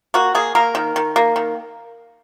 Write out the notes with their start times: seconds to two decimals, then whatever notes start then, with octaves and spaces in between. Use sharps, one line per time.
0.14 A#3 F#4
0.35 A#3 G#4
0.55 A#3 A#4
0.75 D#3
0.96 D#3
1.16 A#3
1.36 D#3